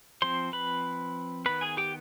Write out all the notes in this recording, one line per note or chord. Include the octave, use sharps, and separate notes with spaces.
F3 C4 C5 C6
B4 B5
D#3 B3 B4 B5
G#4 G#5
G4 G5